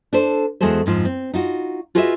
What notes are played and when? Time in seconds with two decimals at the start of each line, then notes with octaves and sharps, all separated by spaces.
0.13 D4 A4 C5
0.61 E2 G#3 F#4 G#4 A4 C5
0.86 F2 G#2 F3
1.05 C4
1.34 D#4 F4 F#4
1.95 F4 F#4 G#4 B4 D#5 E5